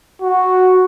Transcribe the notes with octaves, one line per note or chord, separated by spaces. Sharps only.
F#4